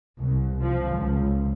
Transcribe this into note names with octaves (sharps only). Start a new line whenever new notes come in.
C2
F3
C#2